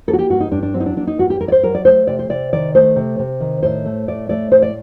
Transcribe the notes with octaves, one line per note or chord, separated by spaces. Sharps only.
A#3 A4
F#4
G4
G2 F#4
D#4
G2 D4
D4
F#3 C4
D#4
D4
A#3 D4
D#4
G2 F#4
G4
G2 A#4
D5
C5
F#3 A#4
D5
A3 C5
C3 D5
C5
C3 D5
D#3 D5
A3 C5
C3
C3
D#3
A2 C5
A3
A2 D5
A3 D5
A2 C5
D5